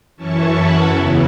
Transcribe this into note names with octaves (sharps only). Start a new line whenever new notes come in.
F#2 E3 C#4 E4 A5 C#6
F#5 B5
E2 C#3 F#3 B3 E4